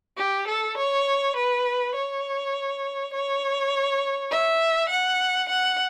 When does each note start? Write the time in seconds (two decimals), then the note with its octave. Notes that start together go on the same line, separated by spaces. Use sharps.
0.17 G4
0.48 A4
0.77 C#5
1.36 B4
1.95 C#5
3.13 C#5
4.31 E5
4.90 F#5
5.49 F#5